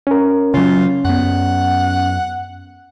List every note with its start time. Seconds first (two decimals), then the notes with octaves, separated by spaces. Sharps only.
0.07 C#4 A#4
0.54 C#3 F#3 C#4 F4
1.05 F#2 B3 F#5